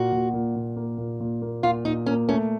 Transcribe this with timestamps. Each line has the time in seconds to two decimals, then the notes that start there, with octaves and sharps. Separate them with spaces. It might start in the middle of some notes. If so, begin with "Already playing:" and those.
Already playing: A#2 A#3 F#4
0.12 A#2
0.33 A#2
0.56 A#2
0.76 A#3
0.98 A#2
1.20 A#2
1.42 A#3
1.63 A#2 F4
1.85 A#2 D#4
2.06 A#3 C#4
2.29 A3 C#4